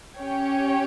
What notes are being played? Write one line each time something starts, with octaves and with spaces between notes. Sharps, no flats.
C#4 G4 C#5 G5